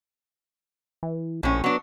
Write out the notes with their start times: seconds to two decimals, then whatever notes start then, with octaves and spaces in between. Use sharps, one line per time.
1.03 E3
1.43 A#1 A2 C#4
1.64 F#3 B3 D4